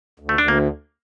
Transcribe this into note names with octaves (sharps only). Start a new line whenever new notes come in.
D2
A3
D2 D4
A#3